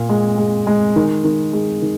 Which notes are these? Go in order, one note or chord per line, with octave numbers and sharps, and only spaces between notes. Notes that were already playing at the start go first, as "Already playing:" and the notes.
Already playing: A#2
G#3
G#3
G#3
D#3
D#3
G#3
D#3